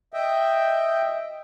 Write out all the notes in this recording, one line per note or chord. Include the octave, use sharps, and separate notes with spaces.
D#5 E5 G5